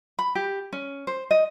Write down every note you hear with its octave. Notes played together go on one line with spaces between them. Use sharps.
B5
G4
C#4
C5
D#5